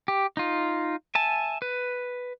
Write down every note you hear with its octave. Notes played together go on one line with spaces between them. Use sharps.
G4
D#4 F4
E5 G#5 A5
B4